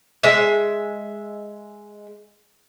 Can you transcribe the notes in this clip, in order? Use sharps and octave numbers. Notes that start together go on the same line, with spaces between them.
G#3 E5